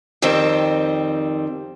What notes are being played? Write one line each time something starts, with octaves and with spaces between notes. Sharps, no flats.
F2 D#3 G3 C4